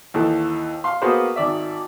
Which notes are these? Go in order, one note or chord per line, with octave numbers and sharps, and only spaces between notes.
D#2 E3 A4
F5 C6
A#3 B3 F#4 G#4 B4 C5
G#1 D#3 D5 E5